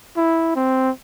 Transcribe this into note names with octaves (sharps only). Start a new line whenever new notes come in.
E4
C4